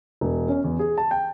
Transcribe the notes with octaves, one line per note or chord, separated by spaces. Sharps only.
E1
C#4
E2
G#4
A5
G5